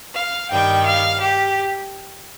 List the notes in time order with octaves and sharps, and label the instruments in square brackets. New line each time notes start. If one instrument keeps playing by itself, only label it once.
[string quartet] F5
G2 D#3 G3 G5
F5
G4